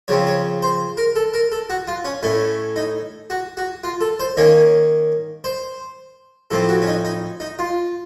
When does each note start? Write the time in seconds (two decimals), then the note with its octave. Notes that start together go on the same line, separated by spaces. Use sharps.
0.08 C#3 F3 C4 C#5
0.27 C#5
0.62 C5
0.97 A#4
1.16 A4
1.34 A#4
1.52 A4
1.70 F#4
1.88 F4
2.05 C#4
2.23 A2 A3 C#4
2.76 D#4
3.30 F#4
3.57 F#4
3.84 F4
4.01 A4
4.20 C5
4.37 D#3 A#3 C#4 C#5
5.44 C5
6.51 A2 F3 C4 A4
6.69 F#4
6.82 C#4
6.87 D#4
7.05 D#4
7.40 D#4
7.59 F4